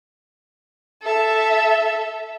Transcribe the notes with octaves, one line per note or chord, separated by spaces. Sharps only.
A4 E5